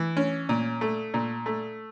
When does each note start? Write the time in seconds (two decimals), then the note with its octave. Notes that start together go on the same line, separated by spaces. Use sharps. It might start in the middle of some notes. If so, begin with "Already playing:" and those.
Already playing: E3
0.17 C#4
0.49 A#2
0.81 A3
1.14 A#2
1.46 A3